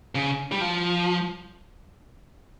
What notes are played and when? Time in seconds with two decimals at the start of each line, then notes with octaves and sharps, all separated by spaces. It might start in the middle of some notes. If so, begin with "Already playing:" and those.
0.15 C#3
0.52 G3
0.61 F3